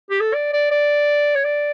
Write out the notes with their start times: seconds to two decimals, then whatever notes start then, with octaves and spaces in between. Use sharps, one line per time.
0.10 G4
0.20 A4
0.34 D5
0.53 D5
0.71 D5
1.35 C#5
1.44 D5